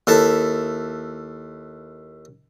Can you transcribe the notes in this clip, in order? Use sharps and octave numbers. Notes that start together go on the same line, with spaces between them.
D#2 E4 A4 E5